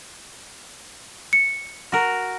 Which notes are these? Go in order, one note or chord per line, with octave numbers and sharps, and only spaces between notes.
C#7
F#4 A#4